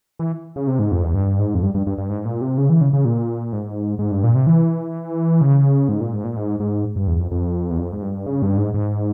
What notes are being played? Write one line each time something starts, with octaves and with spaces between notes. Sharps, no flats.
E3
C#3
C3
G#2
F2
E2
G2
G#2
F2
G2
G2
G2
G2
G#2
A#2
C3
C#3
E3
C#3
C#3
A#2
G#2
G#2
G2
A#2
C3
E3
C#3
G#2
A#2
G#2
A#2
G#2
G#2
G2
E2
F2
F2
E2
F2
G#2
G2
C#3
G2
G#2
G#2